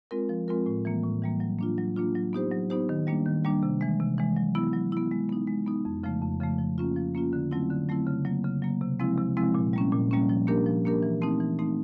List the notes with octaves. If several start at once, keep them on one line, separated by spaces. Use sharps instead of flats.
G#3 C4 F4 A#4
F3
G#3 C4 F4 A#4
A2
E3 G3 A#3
A2
E3 G3 A#3
F#3
A#3 D4 F4
F#3
A#3 D4 F4
F#3
B3 D#4 G4 C5
F#3
B3 D#4 G4 C5
D#3
G3 A#3 D4
D#3
G3 A#3 D4
C3
E3 G#3
C3
E3 G#3
F#3
B3 E4
F#3
B3 E4
G#3
B3 D#4
G#3
B3 D#4
F2
C#3 F3 A3
F2
C#3 F3 A3
F3
A#3 C#4 F4
F3
A#3 C#4 F4
D3
F#3 A3 C4 E4
D3
F#3 A3 C4 E4
C#3
F#3 A#3
C#3
F#3 A#3
C3
F3 G#3 C4 E4
C3
F3 G#3 C4 E4
A#2
G3 A#3 C#4
A#2
G3 A#3 C#4
F3
A#3 D4 G4 A#4
F3
A#3 D4 G4 A#4
E3
A3 C4 D#4
E3
A3 C4 D#4